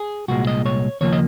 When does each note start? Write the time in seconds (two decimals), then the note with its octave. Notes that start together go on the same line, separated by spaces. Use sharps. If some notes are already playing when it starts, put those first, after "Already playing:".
Already playing: G#4
0.28 C2 A#2 G#3 F#4
0.47 D#5
0.66 C#5
1.01 D#2 C#3 F3 A#3 C#5
1.13 D#5